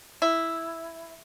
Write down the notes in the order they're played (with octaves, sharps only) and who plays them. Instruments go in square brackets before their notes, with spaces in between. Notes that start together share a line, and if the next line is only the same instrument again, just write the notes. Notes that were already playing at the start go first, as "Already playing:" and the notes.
[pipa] E4